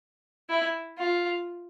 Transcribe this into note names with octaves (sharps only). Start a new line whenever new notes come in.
E4
F4